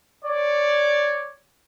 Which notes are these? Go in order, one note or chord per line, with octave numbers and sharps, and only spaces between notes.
C#5 D5